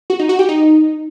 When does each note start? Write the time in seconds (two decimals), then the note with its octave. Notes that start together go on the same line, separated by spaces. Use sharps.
0.10 F#4
0.19 D#4
0.29 F#4
0.39 G4
0.49 D#4